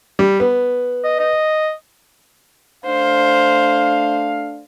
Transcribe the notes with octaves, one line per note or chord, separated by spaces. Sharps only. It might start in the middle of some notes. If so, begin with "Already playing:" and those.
G3
B3
D#5
D#5
A3 D4 C5 F5